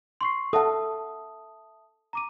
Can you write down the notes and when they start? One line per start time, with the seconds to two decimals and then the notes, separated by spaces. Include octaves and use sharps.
0.21 C6 C#6 C7
0.53 A4 E5 F#5 A5 D#6
2.13 A#5 D6 D#7